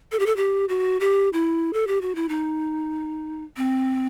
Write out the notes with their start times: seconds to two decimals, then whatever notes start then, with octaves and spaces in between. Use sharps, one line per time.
0.12 A4
0.19 G4
0.26 A4
0.36 G4
0.69 F#4
1.00 G4
1.33 E4
1.73 A4
1.87 G4
2.01 F#4
2.15 E4
2.29 D#4
3.57 C4